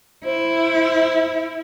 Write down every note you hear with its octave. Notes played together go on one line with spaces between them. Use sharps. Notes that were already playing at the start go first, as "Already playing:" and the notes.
E4 C5